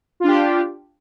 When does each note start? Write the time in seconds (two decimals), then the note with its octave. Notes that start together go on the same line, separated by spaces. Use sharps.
0.20 F4
0.24 D4
0.28 G4